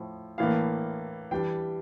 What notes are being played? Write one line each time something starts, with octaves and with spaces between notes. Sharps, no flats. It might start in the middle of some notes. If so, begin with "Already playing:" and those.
Already playing: A2 F3
A2 E3 A#3 D4 F5
E3 G3 D4 G5